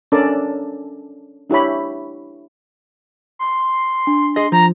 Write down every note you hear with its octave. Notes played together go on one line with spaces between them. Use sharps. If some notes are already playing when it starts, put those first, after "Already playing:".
C#4 D4 A4 A#4 D5 A5
D4 E4 G4 C#5 B5
C6
D4
G#4 D#5 C6
F3 A#5